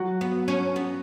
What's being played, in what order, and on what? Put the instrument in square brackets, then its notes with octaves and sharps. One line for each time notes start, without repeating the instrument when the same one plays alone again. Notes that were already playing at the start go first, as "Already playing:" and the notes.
Already playing: [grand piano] F#3 F#4
[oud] B3
C#4
B3